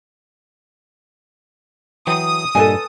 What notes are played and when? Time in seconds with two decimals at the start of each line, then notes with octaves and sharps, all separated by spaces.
2.07 E3 F#3 G5 D#6
2.55 G2 A#2 A4 B4 D#5 G#5